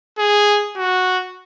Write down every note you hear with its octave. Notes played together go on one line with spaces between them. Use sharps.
G#4
F#4